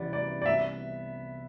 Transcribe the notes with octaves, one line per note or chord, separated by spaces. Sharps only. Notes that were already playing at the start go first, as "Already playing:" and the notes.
Already playing: C2 C3 E3 G3 B3 D5
D5
D5
E5